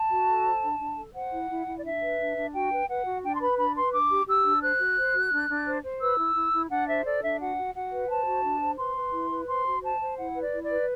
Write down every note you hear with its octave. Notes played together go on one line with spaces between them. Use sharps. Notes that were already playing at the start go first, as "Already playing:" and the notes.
Already playing: A5
F#4
A4
C5
D4
D4
A4
C5 F#5
E4
E4
E4
D5
D4 E5
B4
D4
D4
F#4 G5
B4
B4 F#5
F#4
D4 G5
C6
B4 B5
D4 B5
B4 C6
D4 D6
G4
G4 E6
D4
C5 F#6
F#4
C5
F#4
D4
D4
C5
C5
B4 E6
E4
E4
E4
D4 F#5
C5 E5
A4 D5
D4 E5
F#4 F#5
F#4
F#4 F#5
B4
C5 A5
F#4
D4
C5
B4 C6
B4
E4
B4
C5 C6
F#4
C5 A5
C5
E4 F#5
B4
D5
E4
D5
B4